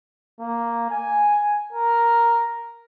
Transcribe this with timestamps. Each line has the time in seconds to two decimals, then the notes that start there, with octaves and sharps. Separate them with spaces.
0.40 A#3
0.90 G#5
1.73 A#4